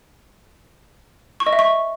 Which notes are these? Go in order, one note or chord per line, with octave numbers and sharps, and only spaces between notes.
C#6
D#5
E5
C#6